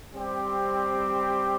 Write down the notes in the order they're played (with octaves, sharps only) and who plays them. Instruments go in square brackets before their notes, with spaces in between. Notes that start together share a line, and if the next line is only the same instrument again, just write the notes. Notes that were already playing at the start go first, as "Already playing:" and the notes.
[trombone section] G3 C4 G4